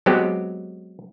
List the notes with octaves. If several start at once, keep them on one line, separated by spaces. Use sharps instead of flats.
F#3 G#3 B3 C4 G4